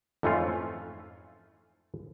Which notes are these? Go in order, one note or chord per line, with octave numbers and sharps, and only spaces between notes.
F2 G#2 E3 A3 C#4 F4